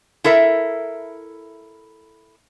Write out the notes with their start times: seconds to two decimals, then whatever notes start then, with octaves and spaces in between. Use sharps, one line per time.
0.24 E4 A4 A#4 E5